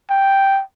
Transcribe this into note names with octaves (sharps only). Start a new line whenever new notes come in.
G5